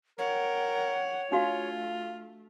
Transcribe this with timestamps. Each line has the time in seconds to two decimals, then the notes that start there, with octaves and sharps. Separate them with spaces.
0.19 A#4 C#5 F#5 G5
1.32 A3 D4 F4 F#4 F5